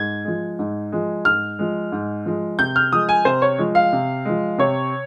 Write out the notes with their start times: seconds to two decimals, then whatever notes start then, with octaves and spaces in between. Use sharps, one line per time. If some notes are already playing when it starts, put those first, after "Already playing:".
Already playing: G#2 G#6
0.25 F3 G#3
0.59 G#2
0.92 F3 G#3
1.25 G#2 F6
1.59 F3 G#3
1.92 G#2
2.26 F3 G#3
2.59 C3 G6
2.76 F6
2.93 F3 G#3 D#6
3.09 G#5
3.25 C3 C5
3.42 C#5
3.58 F3 G#3
3.75 F5
3.93 C3
4.25 F3 G#3
4.58 C3 C#5